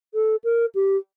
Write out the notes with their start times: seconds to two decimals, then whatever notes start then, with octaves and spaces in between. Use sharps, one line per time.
0.14 A4
0.44 A#4
0.75 G4